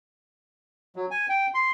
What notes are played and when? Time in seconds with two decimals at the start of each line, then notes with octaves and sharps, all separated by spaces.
0.96 F#3
1.11 G#5
1.29 G5
1.54 C6